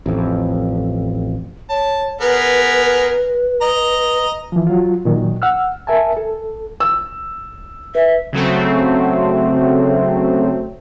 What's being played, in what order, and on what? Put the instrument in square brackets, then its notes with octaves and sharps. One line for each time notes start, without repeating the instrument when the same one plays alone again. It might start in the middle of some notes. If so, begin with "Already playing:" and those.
[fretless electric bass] A1 F2
[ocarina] C#5 [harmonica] A5
[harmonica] B3 G#4 A#4 [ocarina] B4
[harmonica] D#5 A#5
[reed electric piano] E3 F3
F#3 F4
A#2 D#3 F#3
F#5 E6 F6
A#4 E5 G#5 A5
A4
[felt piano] E6
[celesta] B4 [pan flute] E5
[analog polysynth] C#3 F#3 A3 C4